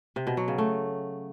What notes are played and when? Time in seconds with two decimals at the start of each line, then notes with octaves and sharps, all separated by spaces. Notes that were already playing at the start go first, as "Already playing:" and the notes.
0.16 C3
0.27 B2
0.37 F#3
0.48 C#3
0.58 A3